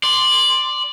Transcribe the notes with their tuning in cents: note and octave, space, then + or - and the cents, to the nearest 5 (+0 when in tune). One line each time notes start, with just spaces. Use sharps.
D5 +0 C6 +0